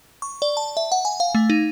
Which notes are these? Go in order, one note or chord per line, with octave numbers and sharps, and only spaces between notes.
C#6
D5
A5
E5
F#5
G#5
F5
A3
D#4